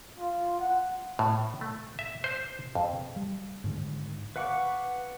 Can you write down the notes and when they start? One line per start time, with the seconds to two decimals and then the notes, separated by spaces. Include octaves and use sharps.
0.18 F4
0.60 F#5
1.19 A2
1.61 A3
1.99 E5
2.24 C5
2.75 F2
3.16 G3
3.64 G#2 D3 D#3
4.36 B4 F5 F#5 C#6 D6